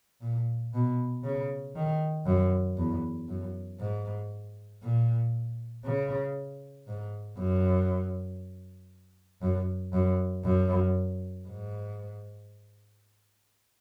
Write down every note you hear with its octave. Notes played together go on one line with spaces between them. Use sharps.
A#2
B2
C#3
D#3
F#2
E2
F#2
G#2
A#2
C#3
G#2
F#2
F#2
F#2
F#2
G#2